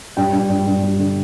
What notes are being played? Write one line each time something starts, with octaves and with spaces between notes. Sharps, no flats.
G2 G5
G2
G2
G2
G3
D3